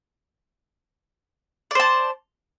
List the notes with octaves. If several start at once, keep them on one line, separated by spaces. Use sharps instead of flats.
C5 D5 A5